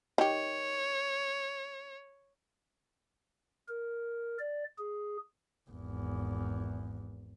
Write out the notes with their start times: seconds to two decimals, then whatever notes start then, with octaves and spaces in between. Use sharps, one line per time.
0.18 D#3 G4 C#5
3.69 A#4
4.39 D5
4.78 G#4
5.70 G#1 E2